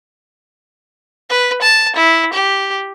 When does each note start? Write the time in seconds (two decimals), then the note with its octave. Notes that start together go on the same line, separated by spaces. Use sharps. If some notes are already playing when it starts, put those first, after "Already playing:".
1.30 B4
1.62 A5
1.96 E4
2.33 G4